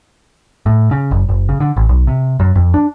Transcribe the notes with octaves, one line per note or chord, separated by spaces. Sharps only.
A2
C#3
F#1
F#1
C#3
D3
A1
B1
C3
F#2
F2
D4